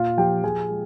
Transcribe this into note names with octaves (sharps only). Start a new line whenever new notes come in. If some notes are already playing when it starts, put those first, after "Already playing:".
Already playing: A#2 F4 F5
F3 G4 G5
F3 G#4 G#5
G#3